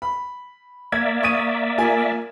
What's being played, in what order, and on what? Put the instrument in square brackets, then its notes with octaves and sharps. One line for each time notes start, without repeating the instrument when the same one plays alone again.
[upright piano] B5
[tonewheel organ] A#3 D5 E5 [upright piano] G#6
[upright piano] C#6 D#6 D#7
F4 A#4 G#5